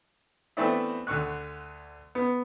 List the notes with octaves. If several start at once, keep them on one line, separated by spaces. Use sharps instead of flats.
E3 A3 B3 C4 D4 E4
D2 D3 C#6 F#6
B3